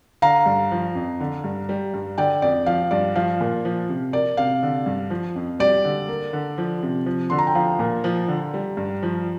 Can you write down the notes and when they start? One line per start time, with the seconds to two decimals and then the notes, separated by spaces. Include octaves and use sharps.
0.22 D3 F5 A#5
0.46 G2
0.71 F3
0.95 F2
1.20 D3
1.44 G2
1.69 G3
1.94 G2
2.18 D3 D5 G5
2.42 F2 D5
2.66 F3 F5
2.91 G2 D5
3.15 F3 F5
3.40 A#2
3.65 F3
3.89 C3
4.13 A#3 D5
4.37 C3 F5
4.63 D3
4.86 G2
5.10 F3
5.35 F2
5.59 G3 D5
5.85 D3
6.08 A#3
6.33 D3
6.58 F3
6.83 C3
7.06 F3
7.30 D3 C6
7.38 A#5
7.47 G5
7.55 F3 F5
7.79 A#2
8.04 F3
8.28 D3
8.54 G3
8.77 G2
9.03 F3